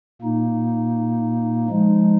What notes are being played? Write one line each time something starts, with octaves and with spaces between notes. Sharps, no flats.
A#2 A#3 D#4
F3 G#3 D#4